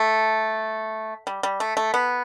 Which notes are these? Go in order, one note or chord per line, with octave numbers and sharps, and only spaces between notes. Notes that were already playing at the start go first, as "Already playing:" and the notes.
Already playing: A3
G3
G3
A3
A3
B3